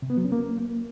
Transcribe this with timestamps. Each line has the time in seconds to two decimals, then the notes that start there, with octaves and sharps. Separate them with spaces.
0.02 C3
0.10 B3
0.17 F#3
0.25 C#4
0.32 A#3